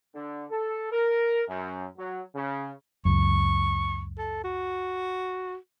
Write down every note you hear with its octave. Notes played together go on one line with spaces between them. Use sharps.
D3
A4
A#4
F#2
F#3
C#3
C#2 F#2 C#6
A4
F#4